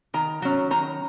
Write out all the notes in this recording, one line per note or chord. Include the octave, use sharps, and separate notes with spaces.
D#3 A#5
F#3 C#4
D#3 A#5